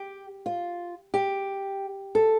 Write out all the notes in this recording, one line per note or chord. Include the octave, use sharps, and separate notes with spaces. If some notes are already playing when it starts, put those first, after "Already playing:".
Already playing: G4
F4
G4
A4